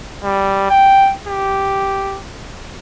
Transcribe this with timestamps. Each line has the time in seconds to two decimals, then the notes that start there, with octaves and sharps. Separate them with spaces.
0.24 G3
0.70 G5
1.27 G4